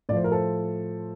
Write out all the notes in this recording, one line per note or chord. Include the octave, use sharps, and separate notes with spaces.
A2 F3 C5 D5
A#4
A4 C5